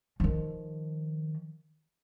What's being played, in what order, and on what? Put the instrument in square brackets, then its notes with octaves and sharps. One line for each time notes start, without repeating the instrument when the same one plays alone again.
[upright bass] D#3 F3